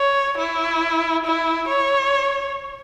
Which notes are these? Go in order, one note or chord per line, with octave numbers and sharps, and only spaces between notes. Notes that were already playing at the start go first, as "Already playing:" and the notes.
Already playing: C#5
E4
E4
C#5